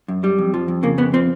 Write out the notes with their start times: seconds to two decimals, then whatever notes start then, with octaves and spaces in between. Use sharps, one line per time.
0.08 F#2
0.24 G3
0.38 F2
0.54 F3
0.68 F2
0.83 C#3 A#3
0.98 F2 B3
1.13 F3 C4